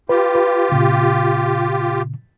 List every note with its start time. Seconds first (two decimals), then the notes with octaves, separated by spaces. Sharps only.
0.09 F4 G4 B4
0.35 B4
0.72 A#2 C#3